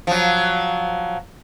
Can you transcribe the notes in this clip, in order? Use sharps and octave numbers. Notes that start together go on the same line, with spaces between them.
F3 F#3